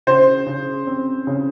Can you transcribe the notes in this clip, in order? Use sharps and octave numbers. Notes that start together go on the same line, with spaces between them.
C#3 C5
C#3
C4
C#3